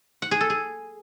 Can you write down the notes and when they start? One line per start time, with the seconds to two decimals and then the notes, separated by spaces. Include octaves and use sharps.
0.22 F#5
0.31 G#4
0.41 A4
0.50 G#4